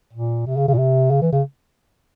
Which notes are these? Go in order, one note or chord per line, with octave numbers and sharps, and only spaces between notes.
A#2
C3
C#3
C#3
A#2
C3
C#3
E3
C#3